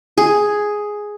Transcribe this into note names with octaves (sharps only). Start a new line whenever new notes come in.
G#4